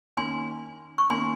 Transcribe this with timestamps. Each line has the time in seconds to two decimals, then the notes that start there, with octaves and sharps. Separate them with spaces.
0.17 D#3 A#3 C#4 G#5 C6
0.98 C#6
1.10 D#3 A#3 C#4 G#5 C6